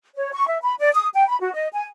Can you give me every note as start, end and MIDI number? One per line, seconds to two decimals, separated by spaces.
0.15 0.30 73
0.34 0.48 85
0.48 0.58 76
0.62 0.74 83
0.80 0.90 74
0.94 1.07 87
1.14 1.27 79
1.28 1.39 83
1.40 1.51 66
1.53 1.67 75
1.73 1.86 80